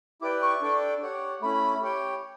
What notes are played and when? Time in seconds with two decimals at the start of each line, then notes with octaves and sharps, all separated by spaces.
0.21 E4 G4 B4 D5 G5 D6
0.42 C#6
0.62 D4 A4 D5 G5
1.02 G4 C#5 F#5
1.42 A3 C#4 E4 B5
1.82 G4 C#5 G5